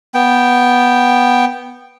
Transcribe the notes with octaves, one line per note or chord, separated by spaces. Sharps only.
B3 G5